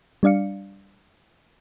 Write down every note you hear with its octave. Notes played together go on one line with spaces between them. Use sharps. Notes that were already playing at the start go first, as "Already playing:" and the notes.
G3 D4 D5 F5 C#7